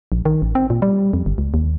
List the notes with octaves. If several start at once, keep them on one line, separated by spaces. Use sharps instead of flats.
A#1
D#3
A1
C4
A#2
G3
F2
G1
C#2
D#2